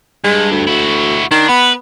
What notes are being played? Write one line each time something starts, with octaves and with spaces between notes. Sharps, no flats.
G2 G#3
D2
E4 F#4
D#3 D4
B3 B4